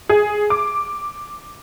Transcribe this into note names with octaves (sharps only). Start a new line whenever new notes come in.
G#4
D6